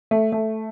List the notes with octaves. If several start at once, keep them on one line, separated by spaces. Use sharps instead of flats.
A3
A3